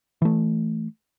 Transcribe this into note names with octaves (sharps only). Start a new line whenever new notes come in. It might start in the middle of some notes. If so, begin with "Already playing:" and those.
E3 A3